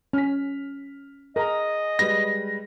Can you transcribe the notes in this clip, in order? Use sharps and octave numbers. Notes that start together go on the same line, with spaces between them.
C#4 F6 B6
G#4 A#4 D#5 A#5
G3 G#3 B4 A#6